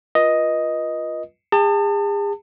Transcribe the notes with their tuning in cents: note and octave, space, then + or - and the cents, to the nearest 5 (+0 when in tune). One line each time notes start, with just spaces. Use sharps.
F4 +0 B4 -40 D#5 +5
G#4 -40 A5 +30